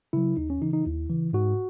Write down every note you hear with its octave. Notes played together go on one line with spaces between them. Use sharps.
C#3 F#3 E4
D#2 D#4
C#4
C#3 E3 D#4
D#4
D#2 E4
C#3 E3
G#2 F#4